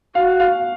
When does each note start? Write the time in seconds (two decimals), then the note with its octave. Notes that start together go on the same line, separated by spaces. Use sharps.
0.15 F#4 F5
0.40 F5